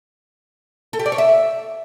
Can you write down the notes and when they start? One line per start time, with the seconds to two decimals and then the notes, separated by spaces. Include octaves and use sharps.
0.93 A4
0.99 G4
1.06 D5
1.12 C#5
1.18 E5